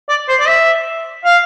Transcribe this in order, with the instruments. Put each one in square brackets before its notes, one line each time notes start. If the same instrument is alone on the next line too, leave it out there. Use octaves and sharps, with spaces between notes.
[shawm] D5
C5
D5
E5
F5